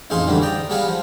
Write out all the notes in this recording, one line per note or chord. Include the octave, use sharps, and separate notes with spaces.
A1 F2 D#4 G#4 F5 C6
D2 G2 D3 E3 G3
D5 G5 A#5 D#6
G3 B3 G#4 B4 F5
F3